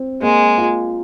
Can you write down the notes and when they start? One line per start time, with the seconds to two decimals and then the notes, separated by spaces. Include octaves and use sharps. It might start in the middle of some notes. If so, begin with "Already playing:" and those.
Already playing: C4
0.22 G#3 A#3
0.58 F4